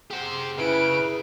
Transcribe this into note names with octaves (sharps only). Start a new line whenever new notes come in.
G4 G#4 C5 F#5
C#3 E4 B4 D7